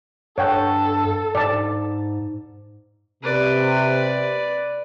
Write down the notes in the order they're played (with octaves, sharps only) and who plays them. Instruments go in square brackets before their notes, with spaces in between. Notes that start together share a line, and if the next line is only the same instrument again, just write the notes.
[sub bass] G2 [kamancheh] A4 [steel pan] C#5 F#5 G5
[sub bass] G#2 [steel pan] D5 A5
[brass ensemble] C3 [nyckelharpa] B4 D5